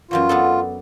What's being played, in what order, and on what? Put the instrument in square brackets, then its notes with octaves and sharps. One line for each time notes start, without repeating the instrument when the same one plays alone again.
[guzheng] F#2 E3 F#3 [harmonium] F4
[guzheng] B3 D4 A4